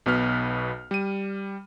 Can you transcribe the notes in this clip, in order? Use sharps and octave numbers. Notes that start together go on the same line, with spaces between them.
B1 B2 B3 B4 F6
G3 D#7